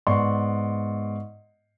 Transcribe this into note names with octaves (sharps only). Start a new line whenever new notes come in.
G#2 B3 D5 C6 C#6